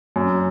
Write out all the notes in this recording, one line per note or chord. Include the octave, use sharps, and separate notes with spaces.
F#2